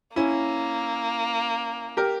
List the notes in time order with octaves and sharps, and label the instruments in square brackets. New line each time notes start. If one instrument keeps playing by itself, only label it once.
[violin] A#3 [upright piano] C#4 E4
[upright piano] G4 A#4